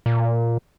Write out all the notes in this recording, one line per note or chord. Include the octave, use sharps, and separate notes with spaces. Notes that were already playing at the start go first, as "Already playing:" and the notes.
A#2